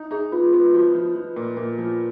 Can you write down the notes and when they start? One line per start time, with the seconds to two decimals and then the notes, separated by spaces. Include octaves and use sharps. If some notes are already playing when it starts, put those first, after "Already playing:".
Already playing: D#4
0.11 D#4 G#4
0.32 B3 F4
0.53 B3 F4
0.74 F3 F#4
0.95 F3
1.15 F3
1.36 A#2
1.57 A#2
1.78 F3